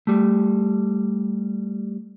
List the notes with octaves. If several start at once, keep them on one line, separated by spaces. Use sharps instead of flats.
G3 A3